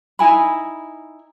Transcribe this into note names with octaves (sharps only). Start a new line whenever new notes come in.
D#4 E4 G#5 B5